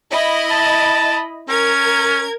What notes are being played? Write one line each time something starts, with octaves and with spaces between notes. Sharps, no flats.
E4 D#5 B5
A5
C#4 A#4 G#6